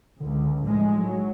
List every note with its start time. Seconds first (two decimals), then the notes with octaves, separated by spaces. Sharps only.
0.20 C#2 D3
0.63 B1 A2 F3 G#3
0.99 F#3